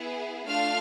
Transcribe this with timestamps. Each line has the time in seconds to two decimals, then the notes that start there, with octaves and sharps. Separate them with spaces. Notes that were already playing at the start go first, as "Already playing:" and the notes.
Already playing: B3 E4 G#4
0.47 A3 D4 F4 F5 F6